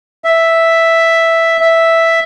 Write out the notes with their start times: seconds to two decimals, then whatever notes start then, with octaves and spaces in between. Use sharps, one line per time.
0.24 E5
1.60 E5